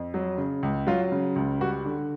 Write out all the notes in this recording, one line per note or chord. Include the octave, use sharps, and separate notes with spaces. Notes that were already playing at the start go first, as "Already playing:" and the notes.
Already playing: F2
F#3
C#3
C#2
F#3 F4
C#3
C#2
G3 F#4
D3